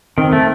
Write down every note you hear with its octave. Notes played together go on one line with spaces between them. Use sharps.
D#3 C4
A3